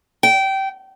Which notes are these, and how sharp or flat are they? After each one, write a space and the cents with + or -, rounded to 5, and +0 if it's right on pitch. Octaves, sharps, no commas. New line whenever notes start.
G5 -20